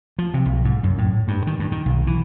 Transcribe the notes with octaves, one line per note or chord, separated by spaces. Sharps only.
F3
C3
B1
G#2
F#2
A2
G2
D#3
G2
D#3
B1
E3